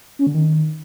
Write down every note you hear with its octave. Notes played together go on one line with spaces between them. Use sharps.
C#4
D3
D#3